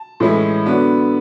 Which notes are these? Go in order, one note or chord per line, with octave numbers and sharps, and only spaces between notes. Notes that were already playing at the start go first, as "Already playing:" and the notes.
Already playing: A5
A2 E3 G#3 C#4 E4
D3 F#3 B3 D4